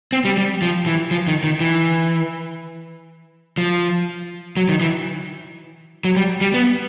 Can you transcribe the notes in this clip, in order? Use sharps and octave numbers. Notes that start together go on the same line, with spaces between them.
C4
G3
G3
F3
E3
F3
D#3
D#3
E3
F3
F#3
D#3
E3
F#3
G3
G3
B3